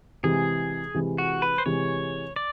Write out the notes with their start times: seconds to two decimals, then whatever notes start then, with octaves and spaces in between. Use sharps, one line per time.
0.23 C3 E3 G#3 G#4
0.94 C3 E3 G#3
1.18 F#4
1.42 B4
1.58 C5
1.66 C3 E3 G#3 C#5
2.36 D5